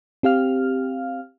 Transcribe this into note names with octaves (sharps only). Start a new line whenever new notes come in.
C4 G4 F5 F6